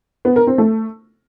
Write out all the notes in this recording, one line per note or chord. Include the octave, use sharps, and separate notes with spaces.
B3
A#4
C4
A3